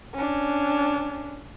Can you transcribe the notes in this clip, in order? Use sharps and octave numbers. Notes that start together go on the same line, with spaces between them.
C#4 D4